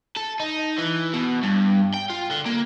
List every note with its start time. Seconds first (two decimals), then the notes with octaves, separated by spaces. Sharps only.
0.16 A4
0.40 D#4
0.78 E3
1.14 B2
1.43 G2
1.94 G5
2.10 F4
2.31 D3
2.46 A#3